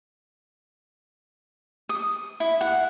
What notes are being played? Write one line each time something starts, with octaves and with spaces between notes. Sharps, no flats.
D#6
E4
F#5